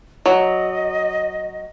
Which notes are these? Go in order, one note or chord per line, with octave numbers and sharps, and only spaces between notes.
F#3 D#5